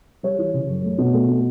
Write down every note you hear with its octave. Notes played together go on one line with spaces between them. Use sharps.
G3 C#5
E3
C#3
F#2
A3
B2
A3
B2